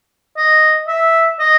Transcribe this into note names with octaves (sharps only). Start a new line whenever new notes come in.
D#5
E5
D#5